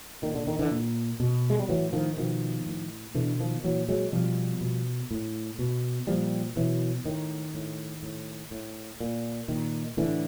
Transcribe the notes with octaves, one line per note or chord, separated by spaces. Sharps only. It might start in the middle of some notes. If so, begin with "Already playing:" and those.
A#2 D#3
D3
D#3
D3 E3
A#2
B2
G#3
G3
A2 E3 F#3
D#3 F3
B2 D#3 F3
A2
B2 D3 E3
D#3 F3
A#2 E3 F#3
F#3 G#3
B2 F3 G3
B2
A2
B2
A#2 F3 G3
B2 E3 F#3
A2 D#3
A2
A2
A2
A#2
A#2 D#3
A2 D3 E3